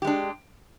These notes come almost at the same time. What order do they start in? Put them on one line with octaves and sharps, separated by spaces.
G4 G#3 D4